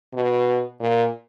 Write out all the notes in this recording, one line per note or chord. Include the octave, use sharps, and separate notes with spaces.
B2
A#2